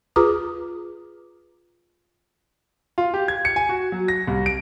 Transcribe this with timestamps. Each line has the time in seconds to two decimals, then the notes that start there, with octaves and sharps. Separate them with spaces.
0.16 F4 G#4 B4 A#5 D6 D#6
2.98 F4
3.14 G4
3.28 G#6
3.45 C#7
3.56 G#5
3.69 F#4
3.92 F#3
4.08 A#6
4.27 C2
4.46 D7